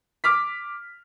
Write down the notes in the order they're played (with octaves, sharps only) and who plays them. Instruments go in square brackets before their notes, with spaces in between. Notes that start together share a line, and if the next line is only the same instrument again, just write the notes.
[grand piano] D6 F6 B6